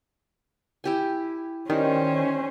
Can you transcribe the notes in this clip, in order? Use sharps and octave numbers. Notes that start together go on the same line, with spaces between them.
E4 G4 G#5
D#3 G3 C#4 C5